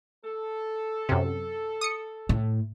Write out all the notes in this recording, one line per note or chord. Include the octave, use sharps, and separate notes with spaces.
A4
F#2 C3
D#6 C#7
A2